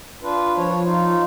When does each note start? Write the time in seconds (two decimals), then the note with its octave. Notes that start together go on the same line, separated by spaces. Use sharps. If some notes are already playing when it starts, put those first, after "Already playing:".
0.22 D4 F4 B4
0.57 F3 C#5
0.84 D#4 F4